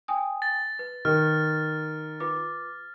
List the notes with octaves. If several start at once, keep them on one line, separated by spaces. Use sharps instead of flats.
G5 G#5 D#6
A6
B4
D#3 F6
F4 B4 D6